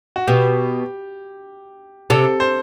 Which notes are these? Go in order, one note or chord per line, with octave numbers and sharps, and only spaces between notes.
F#4
B2 G4
C3 A4
C5